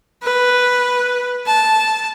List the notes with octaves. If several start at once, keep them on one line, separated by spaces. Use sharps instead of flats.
B4
A5